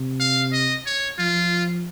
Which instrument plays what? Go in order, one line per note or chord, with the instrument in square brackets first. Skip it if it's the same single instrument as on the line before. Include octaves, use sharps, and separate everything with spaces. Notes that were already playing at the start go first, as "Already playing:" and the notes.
Already playing: [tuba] C3
[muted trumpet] F5
D#5
C#5
[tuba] F3 [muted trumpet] F4